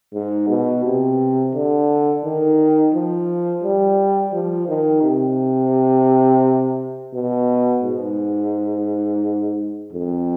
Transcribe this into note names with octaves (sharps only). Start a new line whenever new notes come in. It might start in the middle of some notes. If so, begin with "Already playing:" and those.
G#2
B2
C3
D3
D#3
F3
G3
F3
D#3
C3
B2
G#2
F2